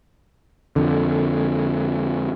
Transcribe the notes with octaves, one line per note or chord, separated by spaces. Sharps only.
F2 D3